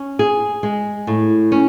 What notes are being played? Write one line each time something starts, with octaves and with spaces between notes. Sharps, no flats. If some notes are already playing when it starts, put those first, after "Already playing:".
Already playing: C#4
G#4
G#3
A2
C#4